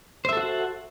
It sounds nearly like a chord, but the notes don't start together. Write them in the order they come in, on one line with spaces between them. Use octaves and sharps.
C5 E5 A4 F#4 F#5